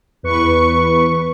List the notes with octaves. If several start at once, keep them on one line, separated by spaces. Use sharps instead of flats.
E2 B4 C#6